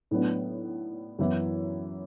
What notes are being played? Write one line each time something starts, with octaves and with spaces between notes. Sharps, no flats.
A2 F#3 B3 D4
F#2 E3 B3 E4